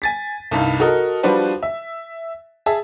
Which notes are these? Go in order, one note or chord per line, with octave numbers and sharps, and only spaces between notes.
G#5 A6 B6
C2 G2 D#4 F5
F#4 A4 A#4 D#5
F3 G3 D4 F#4 B4 C5
E5
G#4 E5 A5